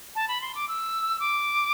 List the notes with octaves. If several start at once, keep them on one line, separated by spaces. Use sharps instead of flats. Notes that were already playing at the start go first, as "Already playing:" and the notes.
A5
B5
C6
D6
E6
D6